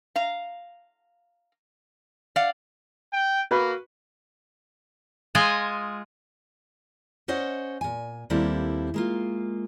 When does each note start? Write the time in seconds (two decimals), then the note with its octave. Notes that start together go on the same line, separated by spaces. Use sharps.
0.16 F5 A#5
2.36 D5 F5 F#5
3.13 G5
3.51 A#3 F#4 B4
5.35 G#3 F4 D#5 G#5
7.28 C#4 C5 C#5 D#5 F#5
7.81 A#2 G#5
8.30 D#2 G3 A#3 C4 E4 A4
8.94 G#3 A#3 F4